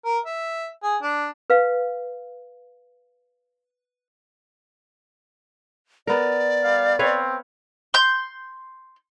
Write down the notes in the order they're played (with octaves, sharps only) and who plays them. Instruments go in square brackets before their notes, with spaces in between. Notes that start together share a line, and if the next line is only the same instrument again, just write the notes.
[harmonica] A#4
E5
G#4
D4
[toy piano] B4 F5
[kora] B3 A#4 [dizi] D5
[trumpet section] G3 F5
[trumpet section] C4 [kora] B4 C#5 F5
[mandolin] C6 G6